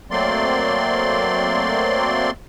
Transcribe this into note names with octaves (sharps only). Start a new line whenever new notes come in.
F#3 A3 A#3 C4 D5 C6